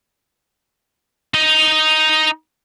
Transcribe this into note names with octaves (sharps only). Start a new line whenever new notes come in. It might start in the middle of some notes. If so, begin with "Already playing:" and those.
D#4 D#5